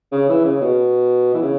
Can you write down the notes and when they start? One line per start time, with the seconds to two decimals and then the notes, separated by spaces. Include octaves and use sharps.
0.12 C#3
0.29 E3
0.45 C#3
0.61 B2
1.34 E3
1.42 C#3